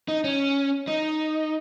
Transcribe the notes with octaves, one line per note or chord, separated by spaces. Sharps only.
D#4
C#4
D#4